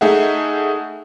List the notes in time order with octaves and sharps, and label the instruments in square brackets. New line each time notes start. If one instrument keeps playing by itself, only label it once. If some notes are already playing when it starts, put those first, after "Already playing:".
[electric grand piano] A3 D#4 G#4 E5 F#5